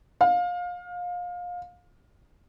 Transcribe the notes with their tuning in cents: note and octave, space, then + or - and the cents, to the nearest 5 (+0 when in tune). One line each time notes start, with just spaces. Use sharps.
F5 +25